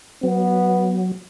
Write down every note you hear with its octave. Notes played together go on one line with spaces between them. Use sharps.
F#3 B3